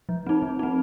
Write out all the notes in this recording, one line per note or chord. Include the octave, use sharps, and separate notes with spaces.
F3
C4 D#4
F3
C4 D#4